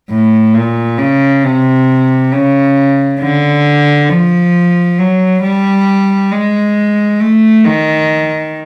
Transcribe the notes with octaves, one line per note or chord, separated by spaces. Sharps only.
A2
A#2
C#3
C3
C#3
D3
F3
F#3
G3
G#3
A3
D#3